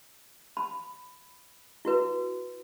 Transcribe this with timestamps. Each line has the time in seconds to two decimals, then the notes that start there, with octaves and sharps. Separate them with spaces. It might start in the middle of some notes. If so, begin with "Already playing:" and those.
0.57 B5
1.85 E4 F#4 B4